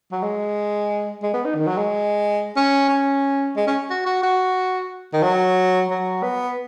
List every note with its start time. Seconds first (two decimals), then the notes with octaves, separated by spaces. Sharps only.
0.12 F#3
0.23 G#3
1.23 G#3
1.34 B3
1.45 D#4
1.55 D#3
1.67 F#3
1.78 G#3
2.56 C#4
2.89 C#4
3.56 G#3
3.67 C#4
3.90 F#4
4.06 F#4
4.23 F#4
5.13 D#3
5.23 F#3
5.90 F#3
6.23 B3